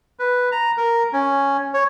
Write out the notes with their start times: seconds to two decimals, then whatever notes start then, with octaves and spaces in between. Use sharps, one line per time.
0.19 B4
0.52 A#5
0.77 A#4
1.13 C#4
1.74 C#5